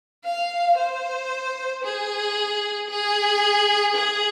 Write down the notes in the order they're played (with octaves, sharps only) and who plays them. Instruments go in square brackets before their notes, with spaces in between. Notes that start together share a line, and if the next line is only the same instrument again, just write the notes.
[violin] F5
C5
G#4
G#4
G#4